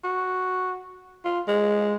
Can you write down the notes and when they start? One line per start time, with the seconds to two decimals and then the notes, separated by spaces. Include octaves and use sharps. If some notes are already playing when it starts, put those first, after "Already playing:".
0.04 F#4
1.25 F4
1.48 G#3